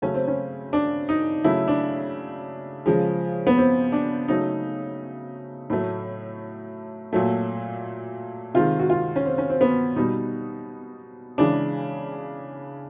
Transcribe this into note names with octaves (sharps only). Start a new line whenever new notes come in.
C#3 F#3 A3 C#4
C4
C#4
D4
D#4
C#3 F#3 A3 E4
D4
C#3 F3 G#3
B3
C4
D4
C#3 F#3 A3 D#4
A2 F#3 A3
A#2 F#3 A3
C3 D#3 G#3 F4
F#4
F4
C#4
C4
C#4
C4
B3
B2 G3 D#4
C#3 E3 G#3 D4